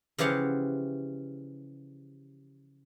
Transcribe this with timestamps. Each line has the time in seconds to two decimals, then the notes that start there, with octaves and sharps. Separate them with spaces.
0.18 C#3 E3 F3 G4 F5 F#5